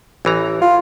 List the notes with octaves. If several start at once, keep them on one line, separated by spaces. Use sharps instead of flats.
A1 E3 A#5
F4